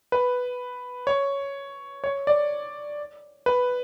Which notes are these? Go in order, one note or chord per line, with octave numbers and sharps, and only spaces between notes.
B4
C#5
C#5
D5
B4